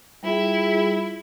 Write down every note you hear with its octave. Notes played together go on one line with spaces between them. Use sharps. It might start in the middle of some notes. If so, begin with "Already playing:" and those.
G3 E4 F4 G#4